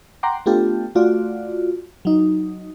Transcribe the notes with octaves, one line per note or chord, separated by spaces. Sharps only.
F#5 G5 A#5 C6 D6
A3 B3 D4 F4 G4 A4
A3 F4 F#4 D5
F#3 D#4